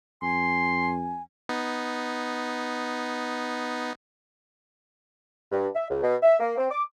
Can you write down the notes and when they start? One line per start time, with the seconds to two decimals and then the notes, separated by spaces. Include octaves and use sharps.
0.22 F2 G#5 C6
1.49 B3 D#4
5.52 G2
5.75 E5
5.90 C#2
6.03 B2
6.23 E5
6.40 A#3
6.57 C4
6.71 D6